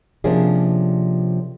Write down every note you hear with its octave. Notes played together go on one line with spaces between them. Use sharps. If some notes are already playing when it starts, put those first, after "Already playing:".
C3 F3 A#3 C#4 D4 G#4